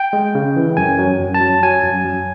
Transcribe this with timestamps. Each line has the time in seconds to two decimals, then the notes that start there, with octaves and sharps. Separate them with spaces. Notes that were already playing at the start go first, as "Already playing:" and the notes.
Already playing: G5
0.13 G#3
0.35 C#3
0.56 E3
0.77 F#2 G#5
0.99 F#3
1.20 F#2
1.34 A5
1.41 F#3
1.63 F#3 G#5
1.84 F#2
2.05 F#3